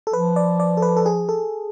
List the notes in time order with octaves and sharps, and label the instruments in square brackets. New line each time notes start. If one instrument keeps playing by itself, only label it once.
[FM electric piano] A4
[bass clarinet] F3 [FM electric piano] B4
[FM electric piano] D5
D5
A4
B4
A4
G#4
A4